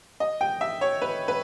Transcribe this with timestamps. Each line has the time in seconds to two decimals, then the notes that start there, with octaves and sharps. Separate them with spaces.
0.20 D#5
0.41 G5
0.61 E5
0.81 C#5
1.02 B4
1.28 B4